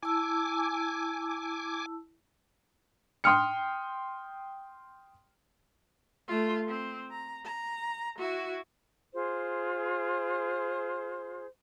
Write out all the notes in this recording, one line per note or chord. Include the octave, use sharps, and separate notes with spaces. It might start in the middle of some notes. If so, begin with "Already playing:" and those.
E4 G#5 A5 D6 E6
G5 C6 D#6 F6 C#7
A3 F4
C4
A#5
A#5
E4 F#4
F4 G#4 C5